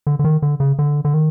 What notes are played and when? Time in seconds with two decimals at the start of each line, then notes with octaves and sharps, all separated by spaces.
0.07 D3
0.19 D3
0.24 D#3
0.42 D3
0.60 C#3
0.79 D3
1.05 D3
1.14 D#3